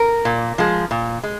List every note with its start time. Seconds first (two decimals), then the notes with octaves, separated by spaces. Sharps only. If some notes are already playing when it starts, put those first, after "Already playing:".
Already playing: A#4
0.25 A#2
0.58 F3 G#3
0.91 A#2
1.23 G#3